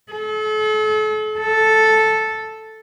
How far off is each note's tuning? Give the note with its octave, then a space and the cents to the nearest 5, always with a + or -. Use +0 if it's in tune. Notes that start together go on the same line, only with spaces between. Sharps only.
A4 -40
A4 -5